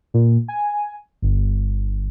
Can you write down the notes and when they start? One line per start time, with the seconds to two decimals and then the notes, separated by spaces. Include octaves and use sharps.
0.14 A#2
0.48 G#5
1.22 G1